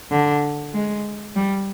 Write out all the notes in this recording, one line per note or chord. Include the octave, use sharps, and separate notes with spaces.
D3
G#3
G3